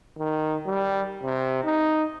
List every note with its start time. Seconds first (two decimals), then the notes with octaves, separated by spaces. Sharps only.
0.18 D#3
0.66 G3
1.23 C3
1.64 D#4